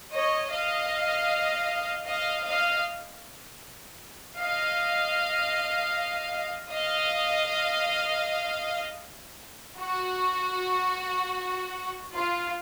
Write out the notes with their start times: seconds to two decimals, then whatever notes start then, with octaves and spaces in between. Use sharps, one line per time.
0.11 C#5 D#5
0.50 D#5 F5
2.05 D#5 F5
2.44 D#5 F5
4.37 D#5 F5
6.70 D#5 F5
9.80 F#4
12.13 F4